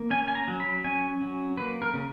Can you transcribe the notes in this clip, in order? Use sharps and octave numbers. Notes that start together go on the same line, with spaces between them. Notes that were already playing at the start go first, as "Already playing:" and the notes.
Already playing: A#3
C#4 G#5
G#5
A#5
F#3
B5
C#4 G#5
F#3
A#3 B4
A#4
C#3